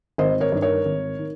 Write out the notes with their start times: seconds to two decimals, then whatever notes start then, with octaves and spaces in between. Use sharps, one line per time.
0.18 G#1 C5 D#5
0.40 A#4 C#5
0.52 G2 D#3
0.62 A#4 C#5
0.85 G#1
1.19 D#3